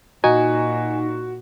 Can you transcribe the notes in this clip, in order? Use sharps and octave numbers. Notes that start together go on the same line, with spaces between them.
A#2 D#4 F#4 G#5